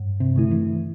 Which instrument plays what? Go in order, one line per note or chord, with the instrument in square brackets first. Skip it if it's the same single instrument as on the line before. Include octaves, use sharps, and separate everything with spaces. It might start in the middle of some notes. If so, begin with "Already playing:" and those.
Already playing: [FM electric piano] G2
[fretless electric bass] C3
[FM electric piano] D3 A3 E4
[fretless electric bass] E3